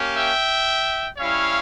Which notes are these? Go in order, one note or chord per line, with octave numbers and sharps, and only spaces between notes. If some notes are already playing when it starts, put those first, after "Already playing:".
Already playing: A#3 C#4 G4
E5 G5
G3 C#4 E4 C#5 F5